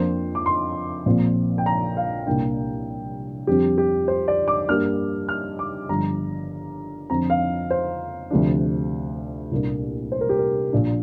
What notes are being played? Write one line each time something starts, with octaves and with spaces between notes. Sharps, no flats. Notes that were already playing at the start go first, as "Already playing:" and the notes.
Already playing: F2 F3 A#3 D4 C5
D6
C6
A#1 A#2 F3 C4
G5
A#5
F5
C2 A#2 A#3 D4 G5
F2 D3 G3 C4 G4
G4
C5
D5
D6
G2 G3 A#3 D4 F6
F6
D6
G1 G2 F3 A#5
F2 D3 F3 C4 A#5
F5
C5
D2 C3 F3 D4
C2 A#2 A#3 D4
C5
A#4
G4
A#4
A#1 A#2 A#3 D4